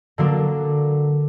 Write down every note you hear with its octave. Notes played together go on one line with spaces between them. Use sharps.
D3 F#3 A#3 D4